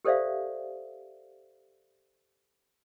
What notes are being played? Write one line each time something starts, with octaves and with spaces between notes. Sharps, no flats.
G4 A4 C5 D5 E5 F5